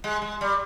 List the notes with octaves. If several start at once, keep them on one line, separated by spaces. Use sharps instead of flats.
G#3
G#3
G3